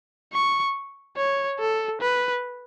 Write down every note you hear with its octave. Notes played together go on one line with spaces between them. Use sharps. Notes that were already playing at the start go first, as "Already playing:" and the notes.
C#6
C#5
A4
B4